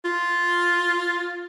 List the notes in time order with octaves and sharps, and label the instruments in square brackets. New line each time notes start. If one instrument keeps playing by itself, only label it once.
[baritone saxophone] F4